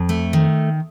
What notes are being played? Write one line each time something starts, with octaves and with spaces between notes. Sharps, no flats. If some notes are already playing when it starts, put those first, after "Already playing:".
Already playing: F2
A3
D#3